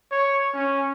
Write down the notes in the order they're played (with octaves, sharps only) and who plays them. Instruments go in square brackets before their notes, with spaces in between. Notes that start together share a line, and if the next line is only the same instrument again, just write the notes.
[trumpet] C#5
C#4